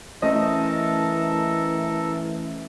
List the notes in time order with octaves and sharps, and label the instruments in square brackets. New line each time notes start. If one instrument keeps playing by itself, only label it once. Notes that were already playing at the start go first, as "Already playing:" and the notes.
[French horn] E3 [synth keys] A3 C#4 C5 [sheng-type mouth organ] A4 A#4 A5 [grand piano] D#5